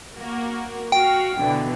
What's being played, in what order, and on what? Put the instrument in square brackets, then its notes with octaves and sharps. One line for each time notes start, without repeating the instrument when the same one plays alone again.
[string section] A#3 F#4 A#4
[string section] F#4 F5 [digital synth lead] G5
[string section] B2 D3 E3